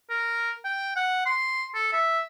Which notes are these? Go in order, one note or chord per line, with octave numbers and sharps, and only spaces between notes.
A#4
G5
F#5
C6
A4
E5